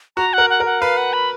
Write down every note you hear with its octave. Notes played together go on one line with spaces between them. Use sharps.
F#4 A#5
A#4 F#5
F#5
A#4
F#5
B4 F5
F#5
B5